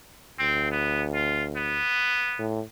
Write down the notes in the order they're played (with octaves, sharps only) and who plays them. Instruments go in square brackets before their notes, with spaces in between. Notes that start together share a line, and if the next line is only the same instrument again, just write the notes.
[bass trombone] D2 [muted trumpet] C4
[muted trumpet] B3
F4
B3
[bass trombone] A2